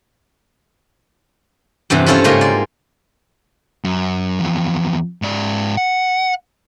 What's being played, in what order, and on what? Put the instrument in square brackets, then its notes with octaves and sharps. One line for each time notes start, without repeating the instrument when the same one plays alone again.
[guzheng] E2 G2 C3 E3
C#4 E4 F4 A4 C5 C#5
G#2 C#3 G#3 A#3 F4 G4
D5
[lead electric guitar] F#2
E2 F3
G#2 D5
F#5